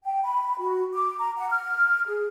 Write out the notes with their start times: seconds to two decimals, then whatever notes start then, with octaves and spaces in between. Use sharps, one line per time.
0.04 G5
0.23 B5
0.59 F#4
0.94 D6
1.18 A#5
1.37 F#5
1.50 F6
2.06 G#4